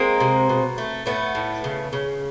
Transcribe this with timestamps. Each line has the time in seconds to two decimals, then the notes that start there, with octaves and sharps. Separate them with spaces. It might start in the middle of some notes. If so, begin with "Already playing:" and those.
Already playing: G#3 A#3 C4
0.20 C3
0.49 B2
0.78 A3
1.06 A2 A3 B3
1.35 A2
1.64 C#3
1.93 C#3